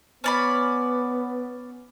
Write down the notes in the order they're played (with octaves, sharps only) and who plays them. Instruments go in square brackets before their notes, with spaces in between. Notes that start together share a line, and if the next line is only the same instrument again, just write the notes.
[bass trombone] B3 [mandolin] C#4 D5 B5